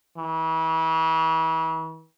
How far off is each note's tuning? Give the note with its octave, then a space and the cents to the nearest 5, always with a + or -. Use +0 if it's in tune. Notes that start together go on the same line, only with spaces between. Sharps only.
E3 -35